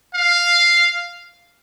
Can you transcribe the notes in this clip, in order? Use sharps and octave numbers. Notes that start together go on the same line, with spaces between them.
F5